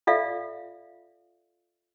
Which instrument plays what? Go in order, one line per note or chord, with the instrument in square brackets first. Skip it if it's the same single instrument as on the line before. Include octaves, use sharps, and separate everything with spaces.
[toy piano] F4 A4 D5 E5 F5